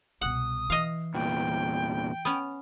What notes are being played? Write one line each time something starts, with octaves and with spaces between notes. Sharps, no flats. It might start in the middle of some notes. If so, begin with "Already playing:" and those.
C2 B2 F#5 D#6
E3 D#5 F5
E2 A#2 G5
B3 C#4